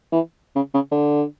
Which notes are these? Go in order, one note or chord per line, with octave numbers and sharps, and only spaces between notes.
E3
C#3
C#3
D3